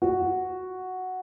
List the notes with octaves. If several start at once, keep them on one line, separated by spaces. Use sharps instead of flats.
F#4